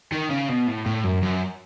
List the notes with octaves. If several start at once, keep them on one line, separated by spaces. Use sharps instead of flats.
D#3
C#3
B2
A2
A2
F#2
F#2